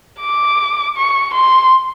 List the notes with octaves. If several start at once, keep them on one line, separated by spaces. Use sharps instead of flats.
D6
C#6
C6